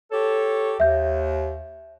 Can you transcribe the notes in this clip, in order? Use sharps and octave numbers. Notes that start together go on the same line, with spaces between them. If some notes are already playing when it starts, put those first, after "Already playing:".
G4 A4 C#5
D#2 E5 G6